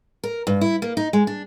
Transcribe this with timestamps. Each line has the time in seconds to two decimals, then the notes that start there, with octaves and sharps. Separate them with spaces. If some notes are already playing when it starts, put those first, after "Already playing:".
0.24 A#4
0.47 G2
0.61 E4
0.82 A#3
0.97 D#4
1.13 G#3
1.27 D4